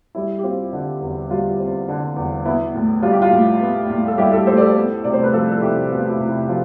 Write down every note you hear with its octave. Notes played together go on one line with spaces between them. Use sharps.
G3 E4
G4
C4 F4
D3
E2
G3 F4
C4
D3
E2
B3 E4
A2
G3 F4
G4
F4
A2
B3
A2
A4
G3 E4 G4
F4 A4
A2 A4 C5
D5
A4 C5
B3
C3 D5
C5
B4
F3 F4 A4
A4
C3 E4 G4
B3 F4
F4
E4
C3
E4
F3 F4